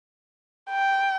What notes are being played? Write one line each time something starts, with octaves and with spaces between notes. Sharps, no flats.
G5